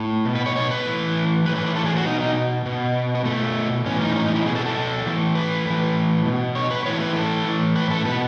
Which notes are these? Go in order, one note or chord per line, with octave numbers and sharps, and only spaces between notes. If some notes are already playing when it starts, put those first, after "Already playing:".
Already playing: A2
B2
B4
C#5
C#5
B4
A2 E3
A2 E3 B4
B4
B4
A4
G#4
F#4
B2 D#4
D#4
B2
B3
B2 A3
A2 E3 C#4
D#4
C#4
D#4
E4
B2 G#4
A4
A4
A2 E3
B4
A2 E3
B2
C#5
B4
A2 E3 C#5
B4
A4
A2 E3
B4
A4
B2 B4